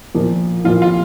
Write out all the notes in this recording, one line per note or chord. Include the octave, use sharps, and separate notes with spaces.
A#2 F3 A#3
A#2 F3 A#3 F4
F4